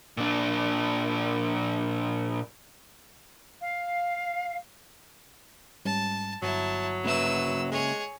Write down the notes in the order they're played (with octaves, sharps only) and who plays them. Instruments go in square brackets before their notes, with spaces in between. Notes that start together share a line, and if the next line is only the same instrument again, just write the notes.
[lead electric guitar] A#2 D4
[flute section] F5
[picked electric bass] G#2 G3 C#4 [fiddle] A5
[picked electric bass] G1 [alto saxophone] F#3 [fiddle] E4 A5
[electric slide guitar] C#3 A#3 E5 [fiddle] B4 E6
[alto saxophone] G#3 [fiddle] G#4 C#5